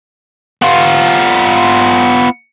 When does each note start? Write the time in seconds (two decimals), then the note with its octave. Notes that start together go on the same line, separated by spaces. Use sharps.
0.62 B3 F4